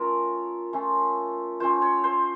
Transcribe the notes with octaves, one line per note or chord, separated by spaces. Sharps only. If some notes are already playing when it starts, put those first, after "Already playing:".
Already playing: A3 C#4 F4 A#4
A3 C#4 F4
A3 C#4 F4 C5
C#5
C5